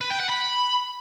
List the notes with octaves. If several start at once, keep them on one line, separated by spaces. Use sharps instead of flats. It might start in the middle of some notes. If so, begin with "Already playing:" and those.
B4
G5
F#5
B5